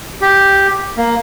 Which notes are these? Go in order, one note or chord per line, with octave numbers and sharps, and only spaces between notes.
G4
A#3